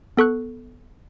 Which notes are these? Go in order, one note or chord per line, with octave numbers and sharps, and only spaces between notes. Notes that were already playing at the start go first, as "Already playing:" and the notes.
B3 A4 C#6 F#6